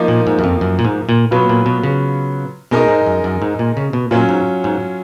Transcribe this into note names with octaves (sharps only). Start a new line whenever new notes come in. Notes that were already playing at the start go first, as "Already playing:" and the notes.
Already playing: F3 A#3 D#4
A#2
G#2
F#2
F2
F#2
A#2
G#2
A#2
B2 F#3 B3 F4 B4
A#2
B2
C#3
B2 G#3 D#4 A#4 D#5
G#2
F#2
F#2
G#2
A#2
C#3
B2
A#2 F#3 C#4 F4
G#2
G#2